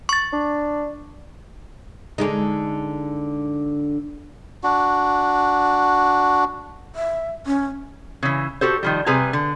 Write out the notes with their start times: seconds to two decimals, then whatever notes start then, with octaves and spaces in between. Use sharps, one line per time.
0.09 C#6 A6
0.33 D4
2.18 D3 G#3 D#4
4.63 D4 F#4
6.96 E5
7.46 C#4
8.23 C#3 E3
8.61 F#4 G4 A4 C5
8.83 D#3 F3 G3
9.06 C3 G3 G#4 B4 G#5 A#5
9.33 D3